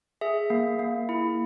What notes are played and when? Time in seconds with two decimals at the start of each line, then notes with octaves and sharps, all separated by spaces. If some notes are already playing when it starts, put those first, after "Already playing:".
0.21 G#4 E5
0.50 A#3
0.79 A#3
1.09 E4